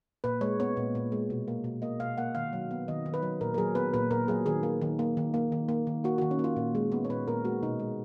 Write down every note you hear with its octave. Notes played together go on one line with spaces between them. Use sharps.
A#2 B4
G#3 C#5
B3 C#5
A#2
A#2
G#3
B2
A#3
B2
A#3 D#5
B2 F5
A#3 F#5
D#3 F5
F#3
B3
D#3 D#5
D#3
B4
F#3
A#2 A#4
A#4
F#3 G#4
B3 B4
A#2 B4
A#2 A#4
F#3 G#4
D#3 G#4
A#3
D#3
A#3
D#3
A#3
D#3
A#3
D#3
A#3 F#4
D#3 F#4
C#4
A#3
F4
A#2
G#3
B3
C#5
A#2 B4
A#2 A#4
G#3 F#4
B2 D#4
G#3